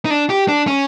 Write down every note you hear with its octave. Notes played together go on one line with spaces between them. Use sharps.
D#4
D4
G4
D4
C#4